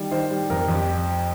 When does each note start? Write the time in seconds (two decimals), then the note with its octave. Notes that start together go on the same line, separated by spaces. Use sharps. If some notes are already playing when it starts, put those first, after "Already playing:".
Already playing: D#3 G3
0.11 D#3 C5
0.30 G3
0.50 F2 A#4
0.68 F2
0.75 G4